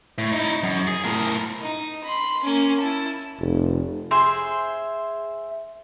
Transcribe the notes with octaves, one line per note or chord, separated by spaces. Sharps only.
A2
D#4 E4
F#2
G#4
A2 A#4
D#4
B5 C6
A#3 C#4
E4 A5
F1
G#4 C5 E5